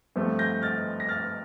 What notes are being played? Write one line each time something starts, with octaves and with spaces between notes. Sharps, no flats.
G2 F3 A3 C4
G6 A#6
F6 A6
A#6
F6 A6